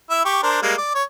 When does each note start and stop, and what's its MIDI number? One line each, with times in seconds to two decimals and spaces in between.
0.10 0.22 64
0.10 0.22 76
0.25 0.40 67
0.25 0.40 85
0.43 0.58 62
0.43 0.58 70
0.43 0.58 72
0.62 0.74 55
0.62 0.74 56
0.62 0.74 58
0.78 0.91 74
0.95 1.03 73